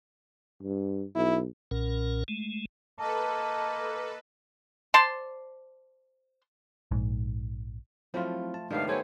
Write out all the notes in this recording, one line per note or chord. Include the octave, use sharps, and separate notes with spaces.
G2
B1 E4
B1 A#2 C#4 A#4
G#3 A3
A#3 A4 B4 D#5 A5
C5 D5 A5 C6
A#1 G#2
F3 F#3 A3 C4 E4 F4
A5
A2 C3 D#3 G#3 A3 B3 D4 F5
B3 C4 G4 A4 C5 C#5 G#5